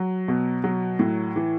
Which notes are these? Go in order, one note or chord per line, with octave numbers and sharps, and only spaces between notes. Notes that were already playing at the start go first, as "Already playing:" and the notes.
Already playing: F#3
B2
F#3
A2
E3